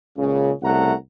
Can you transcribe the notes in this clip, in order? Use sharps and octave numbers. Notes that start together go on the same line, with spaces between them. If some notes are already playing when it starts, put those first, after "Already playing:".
C#2 A#2 C#3
C2 C#3 A3 F#5 A#5